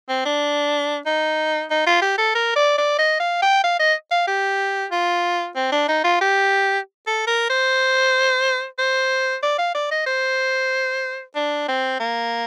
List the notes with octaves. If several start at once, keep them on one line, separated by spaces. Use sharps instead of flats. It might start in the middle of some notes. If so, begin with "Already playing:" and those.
C4
D4
D#4
D#4
F4
G4
A4
A#4
D5
D5
D#5
F5
G5
F5
D#5
F5
G4
F4
C4
D4
D#4
F4
G4
A4
A#4
C5
C5
D5
F5
D5
D#5
C5
D4
C4
A#3